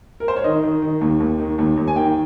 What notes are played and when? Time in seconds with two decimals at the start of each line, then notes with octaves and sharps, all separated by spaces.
0.20 A#4
0.28 C5
0.36 C#5
0.44 D#3 D#5
0.64 D#3
0.82 D#3
1.01 D#2
1.20 D#2
1.40 D#3
1.58 D#2
1.77 D#2
1.88 G#5
1.96 D#3 G5